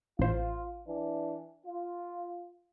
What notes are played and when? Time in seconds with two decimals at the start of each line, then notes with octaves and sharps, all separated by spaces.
0.19 A1 F4 C5
0.88 E3 D4
1.65 F4